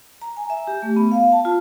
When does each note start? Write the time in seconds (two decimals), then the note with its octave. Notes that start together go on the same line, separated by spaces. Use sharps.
0.22 A#5
0.37 G#5
0.50 E5
0.67 G4
0.82 A3
0.96 B3
1.12 F5
1.32 A5
1.45 F4